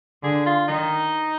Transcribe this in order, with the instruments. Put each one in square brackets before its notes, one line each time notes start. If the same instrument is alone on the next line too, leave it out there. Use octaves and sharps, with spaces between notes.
[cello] D3 [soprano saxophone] G#4
[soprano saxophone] F4
[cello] D#3 [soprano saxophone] D#4